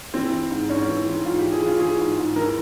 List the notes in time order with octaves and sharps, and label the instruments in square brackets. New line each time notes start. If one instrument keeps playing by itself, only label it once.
[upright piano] E3 C4
E3
G#2
G#2 C#4
E3
E3
G#2 F4
G4
E3
G#4
E3 F4
E3 G#4
G#2
G#2
E3 A#4